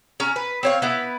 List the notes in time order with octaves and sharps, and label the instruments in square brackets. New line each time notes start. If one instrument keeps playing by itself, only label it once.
[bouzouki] C#4 A#5
B4
C4 C#5 F5
B3 E4 B4